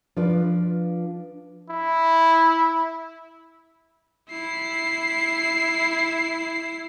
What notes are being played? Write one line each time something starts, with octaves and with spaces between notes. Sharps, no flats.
F3 D4 F4 B4 D5
E4
E4 C7